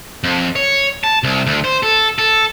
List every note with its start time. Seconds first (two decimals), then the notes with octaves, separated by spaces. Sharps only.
0.24 F2
0.56 C#5
1.04 A5
1.23 C2
1.47 D2
1.64 C5
1.83 A4
2.19 A4